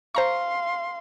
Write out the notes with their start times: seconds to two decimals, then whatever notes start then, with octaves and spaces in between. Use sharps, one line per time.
0.15 C5 F5 A#5 C6 C#6